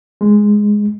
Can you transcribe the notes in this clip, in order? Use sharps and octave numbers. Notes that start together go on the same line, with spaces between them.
G#3